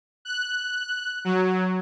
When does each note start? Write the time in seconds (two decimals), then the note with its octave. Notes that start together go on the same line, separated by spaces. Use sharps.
0.25 F#6
1.25 F#3